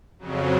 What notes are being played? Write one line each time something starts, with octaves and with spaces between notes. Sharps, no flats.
F2 C#3 F#3